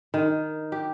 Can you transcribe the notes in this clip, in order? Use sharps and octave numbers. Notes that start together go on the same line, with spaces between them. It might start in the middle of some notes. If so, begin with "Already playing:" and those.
D#3
G4